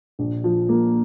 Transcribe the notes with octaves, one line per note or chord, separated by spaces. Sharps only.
A#1
F3
A#3